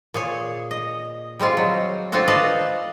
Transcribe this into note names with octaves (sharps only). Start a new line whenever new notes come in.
A#2 G#4 C#5
D#5
G3 G#3 C4 F4
F#3
C4 D4 F4 F#4 A4
B4 D5 D#5 F5 A5